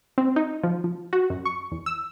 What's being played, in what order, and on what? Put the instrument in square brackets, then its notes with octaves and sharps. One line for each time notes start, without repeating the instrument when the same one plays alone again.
[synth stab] C4
D#4
F3
F3
F#4
F#2
C#6
E2
E6